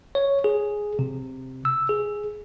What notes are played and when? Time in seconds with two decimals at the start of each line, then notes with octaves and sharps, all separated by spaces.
0.15 C#5
0.44 G#4
0.99 C3
1.65 E6
1.89 G#4